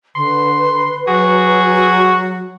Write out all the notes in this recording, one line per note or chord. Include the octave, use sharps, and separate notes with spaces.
D3 B4 C6
F#3 F#4 G#4